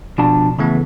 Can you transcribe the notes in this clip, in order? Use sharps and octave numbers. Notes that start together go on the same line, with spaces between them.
B2 F3 D4 A5
C#3 E3 A3 B3